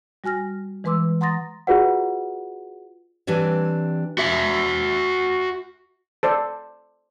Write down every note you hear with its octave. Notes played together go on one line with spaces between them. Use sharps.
G3 F#4 G#5 F6 A#6
E3 G#3 B4 C6 D6 E6
F#5 A#5 C6 D#6 A6 A#6
F4 F#4 G#4 B4 D5 F#5
E3 G3 C4 D4 C#5
F#4 E5
A4 C5 D5